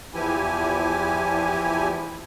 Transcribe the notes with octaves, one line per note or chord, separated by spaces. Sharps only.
E2 E3 F3 E4 G4 G#5